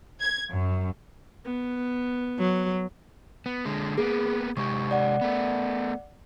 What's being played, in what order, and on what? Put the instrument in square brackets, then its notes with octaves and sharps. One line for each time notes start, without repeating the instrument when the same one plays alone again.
[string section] G#6
F#2
[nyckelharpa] B3
[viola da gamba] F#3
[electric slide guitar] B3
D3 G#3
[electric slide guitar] A#3 B3 [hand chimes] G#4
[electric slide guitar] C3 G#3 G4 [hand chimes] C#6
[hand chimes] D5 F#5
[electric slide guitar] A3 B3